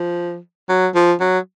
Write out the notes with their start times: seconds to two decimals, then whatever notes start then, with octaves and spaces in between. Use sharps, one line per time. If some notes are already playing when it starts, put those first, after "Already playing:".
Already playing: F3
0.69 F#3
0.95 F3
1.21 F#3